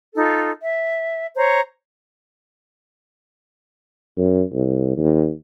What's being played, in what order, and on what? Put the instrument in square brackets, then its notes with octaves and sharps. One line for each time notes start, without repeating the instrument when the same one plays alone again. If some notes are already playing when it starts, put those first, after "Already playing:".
[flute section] D#4 F4 A4
E5
C5 C#5 A#5
[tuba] F#2
C2
D#2